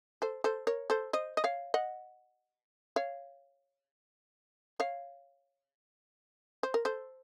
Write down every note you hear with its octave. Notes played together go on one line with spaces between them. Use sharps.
A4 C5
A4 C5
A#4 C#5
A4 C5
C5 D#5
D#5
C#5 F5
D#5 F#5
C#5 F5
C#5 F5
C5
A#4
A4 C5